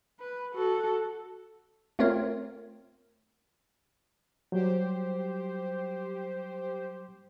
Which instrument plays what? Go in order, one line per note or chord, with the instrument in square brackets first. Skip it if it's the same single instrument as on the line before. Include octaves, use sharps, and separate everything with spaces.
[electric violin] B4
F#4 A4
[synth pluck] A3 C4 F4 A#4 C#5
[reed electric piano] F#3 G3 [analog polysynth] G4 C5